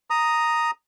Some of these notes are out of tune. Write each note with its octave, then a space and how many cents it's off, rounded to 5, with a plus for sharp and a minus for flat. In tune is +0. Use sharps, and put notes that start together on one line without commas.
A#5 +0 D#6 +0